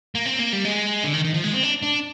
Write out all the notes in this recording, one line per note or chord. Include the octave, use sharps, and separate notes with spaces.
A#3
C4
A#3
G3
G#3
D3
D#3
D#3
F3
G#3
C4
D4
D4